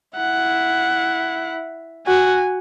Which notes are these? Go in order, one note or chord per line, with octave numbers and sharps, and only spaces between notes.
E4 F#5
F#4 G#5